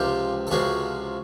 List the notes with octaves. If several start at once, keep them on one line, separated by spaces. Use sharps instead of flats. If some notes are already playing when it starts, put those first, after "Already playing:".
Already playing: C#2 C3 F3 F4 G4
A4
C#2 C3 F3 F#4 G#4